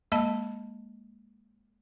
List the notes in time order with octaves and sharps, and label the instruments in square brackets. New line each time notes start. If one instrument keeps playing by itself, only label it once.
[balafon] G#3 A#3 D#5 A5 B5